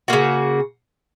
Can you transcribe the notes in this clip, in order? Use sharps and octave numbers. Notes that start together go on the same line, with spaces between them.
C#3 A#3 F#4